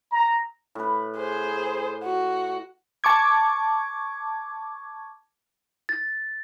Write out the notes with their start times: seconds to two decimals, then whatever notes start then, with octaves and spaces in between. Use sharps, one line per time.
0.11 A#5
0.75 A2 B4
1.18 G#4 C5
2.04 F#4
3.04 A5 C#6 D6 G#6
5.89 A6